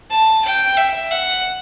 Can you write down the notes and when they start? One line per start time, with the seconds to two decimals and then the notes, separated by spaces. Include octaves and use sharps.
0.11 A5
0.45 G5
0.77 E5
1.11 F#5